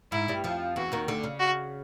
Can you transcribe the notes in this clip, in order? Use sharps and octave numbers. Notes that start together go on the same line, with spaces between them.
G#2 G#3 E4
G2 G3
F2 F3
E2 E3 F#4
D#2 D#3
D2 D3
C#3
F#4